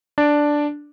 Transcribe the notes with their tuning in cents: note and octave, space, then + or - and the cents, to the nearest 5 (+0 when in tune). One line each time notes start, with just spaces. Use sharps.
D4 +0 D5 +0